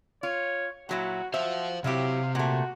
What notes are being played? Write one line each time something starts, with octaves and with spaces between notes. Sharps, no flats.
F4 C#5
A#2 F#3 E4 F#4
F#4 C5 E5 F5
C3 F#3 C4 E4 G4 F5
A#2 A3 F#4